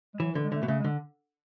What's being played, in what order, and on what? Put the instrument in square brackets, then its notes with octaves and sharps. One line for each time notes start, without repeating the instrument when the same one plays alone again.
[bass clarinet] G#3
[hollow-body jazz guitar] E3 [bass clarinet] F#3
[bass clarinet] E3
[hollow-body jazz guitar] D3
[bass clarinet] G#3
[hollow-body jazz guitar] D3 [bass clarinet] A3
[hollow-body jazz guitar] B2
[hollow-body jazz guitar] C#3 [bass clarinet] A3
[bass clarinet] G#3
[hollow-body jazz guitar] D3